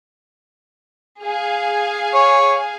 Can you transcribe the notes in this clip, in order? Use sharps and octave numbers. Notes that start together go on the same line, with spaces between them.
G#4 F5 G#5
C#5